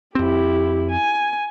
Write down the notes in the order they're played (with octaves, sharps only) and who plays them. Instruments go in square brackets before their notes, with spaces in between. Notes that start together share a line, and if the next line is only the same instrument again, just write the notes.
[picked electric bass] F2 C4 [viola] E4 G4
[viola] G#5